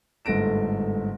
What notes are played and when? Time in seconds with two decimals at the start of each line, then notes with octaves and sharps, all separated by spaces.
0.25 G1 G#2 A3 A#6 D7 E7